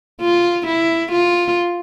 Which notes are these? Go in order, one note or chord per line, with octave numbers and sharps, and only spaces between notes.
F4
E4
F4